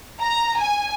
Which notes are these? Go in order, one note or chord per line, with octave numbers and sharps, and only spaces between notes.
A#5
G#5